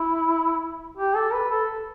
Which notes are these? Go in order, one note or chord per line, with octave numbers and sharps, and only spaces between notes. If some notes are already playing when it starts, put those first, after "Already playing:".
Already playing: E4
G4
A4
B4
A4